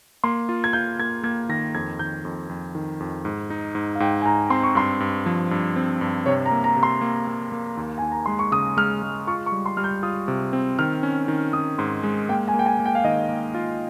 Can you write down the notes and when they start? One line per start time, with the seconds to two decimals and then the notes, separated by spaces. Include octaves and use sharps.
0.24 A#3 C6
0.49 F4
0.64 G#6
0.73 F4 G6
0.99 A#3 G#6
1.23 A#3 G#6
1.49 D#3 A#6
1.75 F2 G#6
1.99 D#3 G6
2.25 F2
2.49 F2
2.75 D#3
3.00 F2
3.25 G#2
3.50 D#4
3.75 G#2
3.95 F5
4.00 G#2 G5
4.21 G#5
4.25 G#2 A#5
4.50 C4 C6
4.63 C#6
4.75 G2 C6
5.00 G2
5.26 F3
5.51 G2
5.76 C4
6.01 G2
6.26 C3 C#5
6.46 A#5
6.51 A#3
6.64 A#5
6.77 C3
6.83 C6
7.01 A#3
7.27 A#3
7.52 A#3
7.77 D#2
7.98 D#2 G#5
8.12 A#5
8.26 G#3 C6
8.39 C#6
8.52 C#3 D#6
8.77 G#3 F6
9.03 G#3
9.27 F4 C#6
9.46 C#6
9.52 G3
9.66 C6
9.77 G3 F6
9.84 G6
10.03 F4 D#6
10.28 C3
10.53 C4
10.79 D#3 F6
11.03 C#4
11.28 D#3
11.53 D#3 D#6
11.78 G#2 C6
12.03 G#3
12.29 A#3 G5
12.48 G#5
12.54 A#3
12.59 G5
12.66 G#5
12.79 A#3
12.85 G5
12.95 F5
13.04 D#3 D#5
13.29 A#3
13.54 F4